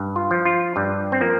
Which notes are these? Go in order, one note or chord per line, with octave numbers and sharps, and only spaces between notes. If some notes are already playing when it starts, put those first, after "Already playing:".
Already playing: G2
F4
F3
F4
G2 G3
C4
F3 A#3